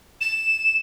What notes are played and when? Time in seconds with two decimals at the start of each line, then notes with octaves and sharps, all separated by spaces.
0.21 E7